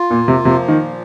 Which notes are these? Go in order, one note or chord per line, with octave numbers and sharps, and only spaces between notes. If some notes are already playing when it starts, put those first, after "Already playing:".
Already playing: F4
A#2 A#3
C3
C3 F3
D#3
A#2